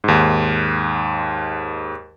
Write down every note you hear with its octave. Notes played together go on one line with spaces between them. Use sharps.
D#2 G#2